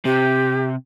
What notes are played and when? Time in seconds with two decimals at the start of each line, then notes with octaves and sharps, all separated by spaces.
0.05 C3 G4